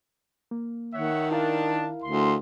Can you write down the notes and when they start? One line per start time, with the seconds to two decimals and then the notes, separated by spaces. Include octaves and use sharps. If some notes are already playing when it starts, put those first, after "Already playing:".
0.51 A#3
0.94 D#3 C#5 E5 F#5
1.31 D4 E4 A#4 F5 A5
2.04 D2 C6